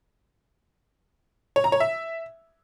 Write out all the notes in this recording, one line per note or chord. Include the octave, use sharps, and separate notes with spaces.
C#5
A#5
C#5
E5